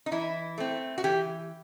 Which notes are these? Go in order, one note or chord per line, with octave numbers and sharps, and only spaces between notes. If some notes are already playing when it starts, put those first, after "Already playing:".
D#4
E3 E4
A3 C4
F#4
E3 G4